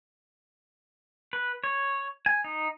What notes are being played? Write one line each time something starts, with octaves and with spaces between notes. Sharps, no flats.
B4
C#5
G#5
D#4